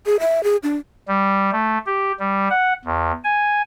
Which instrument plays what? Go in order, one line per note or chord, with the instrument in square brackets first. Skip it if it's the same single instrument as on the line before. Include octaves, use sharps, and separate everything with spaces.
[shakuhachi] G#4
E5
G#4
D4
[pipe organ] G3
A3
G4
G3
F#5
E2
G#5